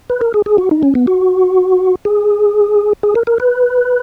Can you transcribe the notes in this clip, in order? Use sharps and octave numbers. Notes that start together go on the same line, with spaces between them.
B4
A#4
G#4
G#4
F#4
D#4
C#4
B3
F#4
G#4
G#4
A#4
A#4
B4